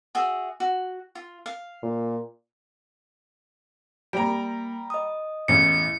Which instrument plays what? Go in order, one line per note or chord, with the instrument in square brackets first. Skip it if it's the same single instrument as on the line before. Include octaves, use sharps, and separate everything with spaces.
[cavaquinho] F#4 G#4 E5
F#4
F4
F5
[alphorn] A#2
[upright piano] G3 A#5 [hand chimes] A#3 D7
[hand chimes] D#5 D#6
[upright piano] A1 E2 C#4 [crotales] C#7